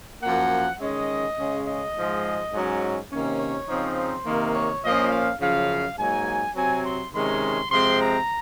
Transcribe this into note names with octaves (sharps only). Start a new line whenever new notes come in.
F#2 F3 A#3 F#5
D#3 G#3 C#4 D#5
C#3 G#3 C#4
D#5
G#2 F3 G#3
G#2 F#3 C#4
C3 D#3 A#3 C#4
C#5
C#3 F3 C4 D#4
C5
C3 D#3 A#3
C#5
A#2 F3 A#3 C#4 D#5
F5
F#2 C#3 F3 F5
G#2 F#3 A#3 D#4 G#5
C3 F#3 C4 G#5
C6
C3 D#3 G#3 C#4 C6
C3 F3 G#3 C4 C6
A#5